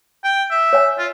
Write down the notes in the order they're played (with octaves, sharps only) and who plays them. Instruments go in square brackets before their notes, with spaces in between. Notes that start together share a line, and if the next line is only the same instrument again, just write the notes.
[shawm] G5
E5
[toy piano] C#5 G#5
[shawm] F4